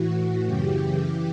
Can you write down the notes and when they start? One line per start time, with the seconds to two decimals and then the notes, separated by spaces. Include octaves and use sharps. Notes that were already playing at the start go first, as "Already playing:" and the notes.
Already playing: A2 E3 F#4
0.17 F#4
0.45 F#2 C#3 E3 G4
0.74 G4
1.02 E3